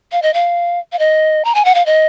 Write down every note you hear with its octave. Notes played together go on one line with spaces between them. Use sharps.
F5
D#5
F5
F5
D#5
A#5
G#5
F#5
F5
D#5